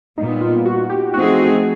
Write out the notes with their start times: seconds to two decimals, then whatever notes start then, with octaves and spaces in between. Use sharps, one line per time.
0.18 A#2 G3 B3 D#4
0.41 F4
0.65 F#4
0.90 G4
1.14 F3 A3 C4 D#4 F#4 G#4